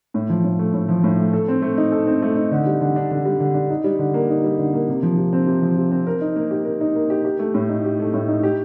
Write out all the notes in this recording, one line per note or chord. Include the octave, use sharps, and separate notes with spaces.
A2
F3
A2
A3
A2
F3
A2
A3
A4
C4
A3
D#4
A4
C4
A3
D#4
D3
G3
D3
D4
D3
G3
D3
D4
D#4
G3
D3
A#3
D#4
G3
D3
A#3
C3
F3
C3
C4
C3
F3
C3
C4
A#4
D#4
A#3
G4
A#4
D#4
A#3
G4
G4
A3
A2
D#4
G4
A3
A2
D#4
G4